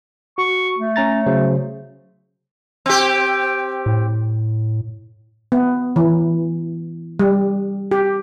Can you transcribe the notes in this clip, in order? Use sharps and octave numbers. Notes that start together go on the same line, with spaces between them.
F#4 C#6
A3
C#4 A#5 A6
C#3 F#3 C5
C4 G4
A2
B3
E3
G3
G4